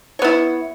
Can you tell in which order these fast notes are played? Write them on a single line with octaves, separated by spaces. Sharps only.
C#5 B3 E4